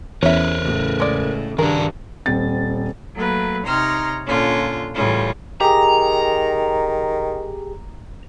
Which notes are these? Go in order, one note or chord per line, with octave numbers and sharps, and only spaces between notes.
E2 C#4 A#4 B4 C#5 E5
A2 C#3
G#3 D5
G2 D#3 D4 G#4 A#4
D#1 C4 A6
F#3 A3 A#3 B4
C3 D#4 C#5 A#5 C6 F6
A#2 D3 C#4 F4
A2 C#3 E3 G3 C#4 F4
D#3 G4 G#4 A#5